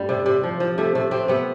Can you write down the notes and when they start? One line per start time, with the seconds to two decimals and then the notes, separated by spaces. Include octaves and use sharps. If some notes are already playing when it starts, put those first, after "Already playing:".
Already playing: G2 G3 A3
0.09 C3
0.26 C3
0.43 F3
0.60 F3
0.78 C3 A3
0.95 C3 A3
1.11 C3 C4
1.28 C3 B3